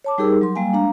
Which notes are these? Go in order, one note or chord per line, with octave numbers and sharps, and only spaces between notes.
C#5 A5 D6
G3 D#4 G4 G#4 A#4 E6
F#3 C6
G3 A#3 F5 G#5
G#3 D4 F5 A#5